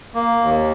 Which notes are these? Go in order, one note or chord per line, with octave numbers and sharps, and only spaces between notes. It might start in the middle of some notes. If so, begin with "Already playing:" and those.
A#3
D#2